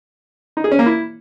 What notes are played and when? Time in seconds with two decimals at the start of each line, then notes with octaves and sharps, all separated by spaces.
0.57 D#4
0.64 G#4
0.72 C#4
0.79 A#3
0.86 E4